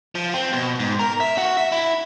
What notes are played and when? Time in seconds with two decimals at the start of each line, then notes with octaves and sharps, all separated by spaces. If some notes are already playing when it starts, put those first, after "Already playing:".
0.15 F3
0.34 C4
0.53 B2
0.80 G#2
0.99 A#4
1.20 E5
1.38 F#4
1.57 E5
1.72 E4